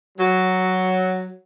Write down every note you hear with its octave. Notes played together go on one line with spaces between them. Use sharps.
F#3